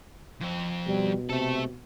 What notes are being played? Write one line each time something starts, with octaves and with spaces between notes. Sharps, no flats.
F2 C4
B2 G3
C3 A3 A4